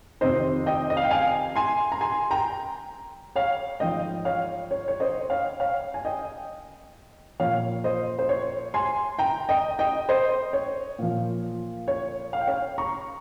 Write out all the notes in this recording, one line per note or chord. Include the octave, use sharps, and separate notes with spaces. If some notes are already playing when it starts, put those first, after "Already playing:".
F2 C3 D#3 C5 D#5
D#5 G5
D#5
F5
G5
F5 G#5
G#5 C6
A#5
G#5 C6
G5 A#5
C#5 F5
G#2 F3 D#5 G5
C#5 F5
C#5
C#5
C5 D#5
C#5 F5
C#5 F5
G#5
D#5 G5
A#2 F3 C#5 F5
C5 D#5
C5
C#5
G#5 C6
G5 A#5
D#5 G5
D#5 G5
C5 D#5
C#5
A#2 F3
C#5
F5
G5
C#5 F5
A#5 C#6